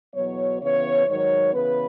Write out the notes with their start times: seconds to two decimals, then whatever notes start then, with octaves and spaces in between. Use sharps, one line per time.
0.13 E2 B2 F#3 B3 C#5
0.60 C#3 E3 B3 C#5
1.06 G#2 D#3 F#3 C#5
1.53 C#3 E3 B3 B4